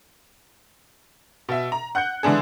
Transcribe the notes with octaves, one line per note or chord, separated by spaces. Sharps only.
B2 E5
A#5
F#5 F#6 G6 C#7
D3 E3 G#3 D4 G#4